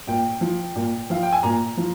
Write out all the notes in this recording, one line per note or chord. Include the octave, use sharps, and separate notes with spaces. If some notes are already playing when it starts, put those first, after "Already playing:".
A#2 G5
F3
A#2
F3 F5
G5
G#5
A#2 A#5
F3